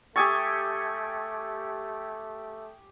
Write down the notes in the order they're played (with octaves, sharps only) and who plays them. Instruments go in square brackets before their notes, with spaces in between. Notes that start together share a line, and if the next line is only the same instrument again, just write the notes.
[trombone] A3 [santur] G4 G#5 C#6 [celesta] D#6 E6 A6